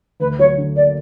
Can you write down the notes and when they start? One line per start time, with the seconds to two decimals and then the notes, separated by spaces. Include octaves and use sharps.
0.20 D2 B4
0.39 F#3 C#5
0.58 D3
0.76 A#3 D5